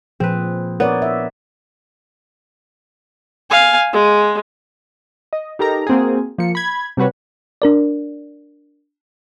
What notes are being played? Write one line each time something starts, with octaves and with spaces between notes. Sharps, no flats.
A#2 F3 C4 G#4 B4
B3 A#4 C#5 D5
E5
F5 G#5
G#3
D#5
D#4 G4 A4 A#4 A#5
A#3 C4 F#4 G#4
F3 A#3 C#7
B5 G#6
C3 G3 F#4 B4 C#5
D4 A#4 D5